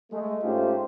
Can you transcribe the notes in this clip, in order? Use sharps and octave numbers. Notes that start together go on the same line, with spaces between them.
G#3 A3
G#2 A3 C#4 F4 G4 C5